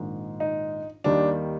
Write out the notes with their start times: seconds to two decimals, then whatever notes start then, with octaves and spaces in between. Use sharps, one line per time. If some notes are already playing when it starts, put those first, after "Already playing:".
Already playing: A#1 G#2 D#3
0.40 D#4
1.04 D#2 D#3 G3 D4